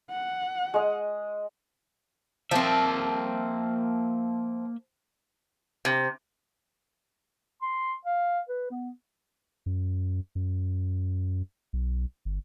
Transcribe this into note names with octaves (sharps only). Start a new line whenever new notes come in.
F#5
G#3 D#5
F3 A#3 C4 E5
C3
C6
F5
B4
B3
F#2
F#2
B1
G1